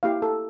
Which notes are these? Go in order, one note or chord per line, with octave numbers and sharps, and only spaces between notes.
A#3 E4 G4 F5
A4